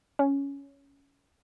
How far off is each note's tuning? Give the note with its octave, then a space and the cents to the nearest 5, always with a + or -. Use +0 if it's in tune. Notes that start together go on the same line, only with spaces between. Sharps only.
C#4 +10